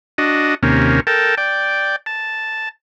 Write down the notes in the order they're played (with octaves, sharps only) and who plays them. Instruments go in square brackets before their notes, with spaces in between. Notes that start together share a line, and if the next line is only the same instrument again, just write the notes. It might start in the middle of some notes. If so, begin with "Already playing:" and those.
[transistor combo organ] D4 F#4 D#5
D#2 C3 A#3 C#4
A4 A#4 G5 A5
D5 G5
A5